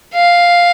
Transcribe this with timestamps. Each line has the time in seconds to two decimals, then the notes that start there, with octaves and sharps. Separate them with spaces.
0.14 F5